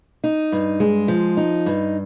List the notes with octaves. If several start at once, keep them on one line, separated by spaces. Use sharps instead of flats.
D#4
G2
G#3
F3
D#4
G2